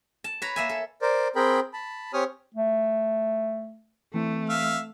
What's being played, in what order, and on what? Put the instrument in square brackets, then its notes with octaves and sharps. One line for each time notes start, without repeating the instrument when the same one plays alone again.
[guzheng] A5
B4 C#5 A#5
A#3 E5 G#5
A4
[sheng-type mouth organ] A#4 C5 D5
C4 G#4 A#4 G5 B5
A5 B5
C4 G4 C#5 G#5 D#6 F6
[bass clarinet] A3
[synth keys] E3 C4 [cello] A3
[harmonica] E5 F5